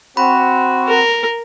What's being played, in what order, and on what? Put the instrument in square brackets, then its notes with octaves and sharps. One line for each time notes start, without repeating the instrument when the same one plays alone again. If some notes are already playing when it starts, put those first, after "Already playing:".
[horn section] C4 F#4 [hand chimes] B5
[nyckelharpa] A#4